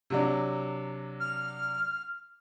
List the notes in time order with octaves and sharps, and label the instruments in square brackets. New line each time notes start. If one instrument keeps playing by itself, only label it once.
[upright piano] C3 F#3 D4
[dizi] F6